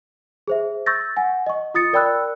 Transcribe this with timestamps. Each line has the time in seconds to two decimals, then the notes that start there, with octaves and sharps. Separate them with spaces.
0.48 G#4 C5 E5
0.86 C#6 E6 G6 A6 A#6
1.17 F#5 G#5
1.47 D#5 C#6
1.74 F4 D#6 A6 C#7
1.93 A#4 D5 G5 B5 E6 F#6